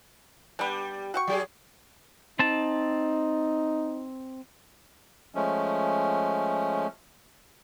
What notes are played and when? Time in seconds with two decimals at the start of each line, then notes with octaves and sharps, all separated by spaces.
0.59 G3 B3 D4 G4
1.14 F#4 G5 C#6
1.27 F#3 G4 G#4
2.39 C4 D#4 A5
5.35 F3 G#3 A3 C#4